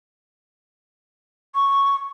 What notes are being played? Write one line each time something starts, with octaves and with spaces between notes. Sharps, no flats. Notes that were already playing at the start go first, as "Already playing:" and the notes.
C#6